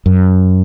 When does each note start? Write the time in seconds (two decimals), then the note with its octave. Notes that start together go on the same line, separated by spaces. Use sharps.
0.06 F#2